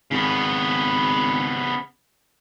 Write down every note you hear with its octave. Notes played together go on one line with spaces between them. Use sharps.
G#1 C#3 B3